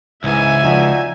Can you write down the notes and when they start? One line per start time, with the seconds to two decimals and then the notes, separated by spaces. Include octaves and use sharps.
0.24 C#2 G#2 E3 E5 G#5
0.64 F3 D#4 F#4 D5